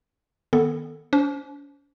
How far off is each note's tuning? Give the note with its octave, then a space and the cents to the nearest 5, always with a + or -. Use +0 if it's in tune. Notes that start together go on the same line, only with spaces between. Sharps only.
D#3 +0 B3 -15 A4 +0
C#4 +45 C5 +0